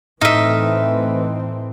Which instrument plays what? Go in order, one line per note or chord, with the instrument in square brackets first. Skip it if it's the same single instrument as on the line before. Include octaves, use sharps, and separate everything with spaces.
[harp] A2 F6 [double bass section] E3 A3 C4 [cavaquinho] D#4 E5